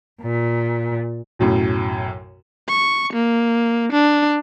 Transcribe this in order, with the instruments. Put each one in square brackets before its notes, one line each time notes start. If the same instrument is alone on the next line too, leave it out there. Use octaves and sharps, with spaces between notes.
[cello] A#2
[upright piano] B1 F#2 A2
[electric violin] C#6
A#3
D4